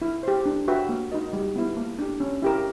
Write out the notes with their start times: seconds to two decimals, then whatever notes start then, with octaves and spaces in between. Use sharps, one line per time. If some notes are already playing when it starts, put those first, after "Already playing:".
0.02 E4
0.23 G4 C5
0.46 D4
0.68 F#4 B4 E5 G5
0.89 A#3
1.12 D#4 F#4 A#4 D#5
1.33 G3
1.56 B3 E4
1.77 A#3
1.99 D4 G4
2.20 C#4
2.42 E4 G4 A#4